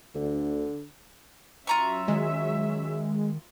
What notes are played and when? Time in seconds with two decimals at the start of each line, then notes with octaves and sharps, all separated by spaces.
0.15 D2 D3
1.67 F#3 C#4 F4 E5 A#5 C#6
2.08 D#3 G#3